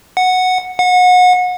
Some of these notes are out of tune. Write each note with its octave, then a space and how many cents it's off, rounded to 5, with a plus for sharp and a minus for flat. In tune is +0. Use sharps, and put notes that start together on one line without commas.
F#5 -5
F#5 -30